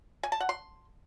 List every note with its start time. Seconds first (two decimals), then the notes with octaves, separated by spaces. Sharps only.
0.23 G#5
0.32 A5
0.40 F#5
0.49 C6